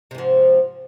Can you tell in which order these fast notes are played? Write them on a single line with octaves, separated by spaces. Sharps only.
C3 G#2 F3